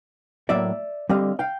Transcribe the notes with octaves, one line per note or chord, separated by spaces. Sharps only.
A2 F#3 A#3 D5 E5
D3 G3 C4 D#5 F5
F5 G5